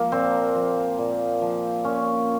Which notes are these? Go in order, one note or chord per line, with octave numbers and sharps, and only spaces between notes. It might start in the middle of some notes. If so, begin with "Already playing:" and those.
Already playing: F3 A#3
A#2 C4
F3
A#2
F3
A#2 C#4